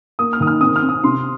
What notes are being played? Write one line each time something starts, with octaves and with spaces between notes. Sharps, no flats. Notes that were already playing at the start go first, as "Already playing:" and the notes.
A#3 D#6
F6
D#3 D#6
F6
C4 D#6
F6
C4
D#6
C3 C6